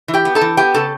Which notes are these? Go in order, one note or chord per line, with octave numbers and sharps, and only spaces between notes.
E3
G4 G5
B3
A4 A5
E3
B3 G4 G5
C#3 A4 A5